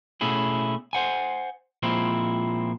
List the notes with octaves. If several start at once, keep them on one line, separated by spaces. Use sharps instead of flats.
B2 A3 C#4 E4 G#4
C5 F#5 G#5
A#2 F3 G#3 C4 E4